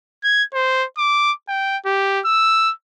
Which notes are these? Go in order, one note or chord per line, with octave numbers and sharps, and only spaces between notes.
G#6
C5
D6
G5
G4
E6